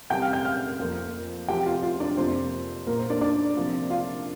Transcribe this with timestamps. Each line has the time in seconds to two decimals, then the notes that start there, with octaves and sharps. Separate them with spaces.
0.10 C3 G3 C4 G5 G6
0.22 F5 F6
0.33 G5 G6
0.45 F5 F6
0.79 F2 F3 A#3
1.48 C3 F3 C4 G4 G5
1.66 F4 F5
1.83 F4 F5
2.00 D4 D5
2.17 F2 C3 A#3 C5
2.87 A#2 A#3 A#4
2.99 C5
3.10 D4 D5
3.21 D4 D5
3.56 C3 F3 A#3
3.90 F4 F5